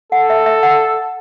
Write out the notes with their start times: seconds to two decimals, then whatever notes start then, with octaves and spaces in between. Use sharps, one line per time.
0.12 A4 F#5
0.30 E5
0.46 E5
0.63 F#5